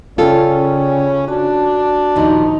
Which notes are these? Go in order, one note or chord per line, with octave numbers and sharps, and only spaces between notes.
C#3 C#4 F4 A4 D5 G5
D4 F#4 A5
D#2 A#2 F3 D#4